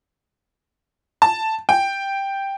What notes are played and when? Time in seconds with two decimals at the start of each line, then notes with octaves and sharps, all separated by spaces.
1.22 A5
1.69 G5